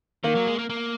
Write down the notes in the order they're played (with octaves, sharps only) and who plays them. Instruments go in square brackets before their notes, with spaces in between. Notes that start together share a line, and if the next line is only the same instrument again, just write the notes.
[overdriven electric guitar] D#3 [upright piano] A#3
[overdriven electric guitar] F#3
G#3
A#3
A#3